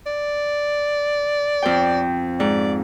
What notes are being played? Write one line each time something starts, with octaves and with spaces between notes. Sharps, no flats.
D5
F2 C5 G5
G#2 D5